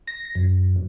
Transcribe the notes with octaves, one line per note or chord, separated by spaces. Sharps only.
A#6
F#2